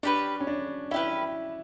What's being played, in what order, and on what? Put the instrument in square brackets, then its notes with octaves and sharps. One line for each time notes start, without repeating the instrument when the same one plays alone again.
[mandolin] C#4 G4 B4 [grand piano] D4
[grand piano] C#4
D4
[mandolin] C#4 G4 B4 [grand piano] E4